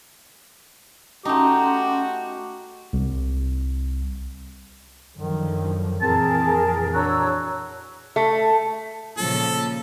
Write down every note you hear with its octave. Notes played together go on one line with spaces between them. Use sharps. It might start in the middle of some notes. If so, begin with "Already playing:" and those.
A3 C#4 D#4 F#4 G4 C6
C2
F#2 D3 D#3 F3
F2 A#2 E3 C4 G#4 A#4 A5
D4 F#4 C#5 A#5 E6
A3
A#2 C#3 F3 A4